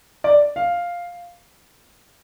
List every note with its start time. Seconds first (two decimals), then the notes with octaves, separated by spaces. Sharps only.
0.24 D5
0.56 F5